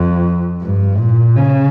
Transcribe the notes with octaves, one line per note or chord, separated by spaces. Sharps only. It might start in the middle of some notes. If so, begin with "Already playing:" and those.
Already playing: F2
G2
A#2
C#3